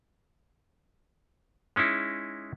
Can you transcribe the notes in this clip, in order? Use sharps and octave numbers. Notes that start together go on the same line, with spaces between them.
G#3 C#4 D#4 E4